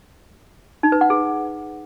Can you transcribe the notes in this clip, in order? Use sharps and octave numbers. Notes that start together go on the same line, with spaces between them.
D#4
B4
F#5
G#4